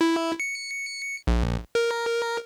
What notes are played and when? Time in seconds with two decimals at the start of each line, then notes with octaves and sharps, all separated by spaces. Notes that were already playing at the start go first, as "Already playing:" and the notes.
0.01 E4
0.40 C#7
1.27 A#1
1.75 A#4